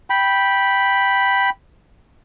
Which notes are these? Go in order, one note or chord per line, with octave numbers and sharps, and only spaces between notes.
G5 B5